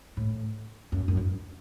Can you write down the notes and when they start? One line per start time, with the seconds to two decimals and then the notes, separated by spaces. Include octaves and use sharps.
0.17 A2
0.92 F#2
1.08 F#2
1.17 G2